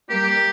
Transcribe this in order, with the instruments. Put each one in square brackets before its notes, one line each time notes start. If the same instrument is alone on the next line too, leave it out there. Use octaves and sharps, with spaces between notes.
[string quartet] G3 A#3 [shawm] G4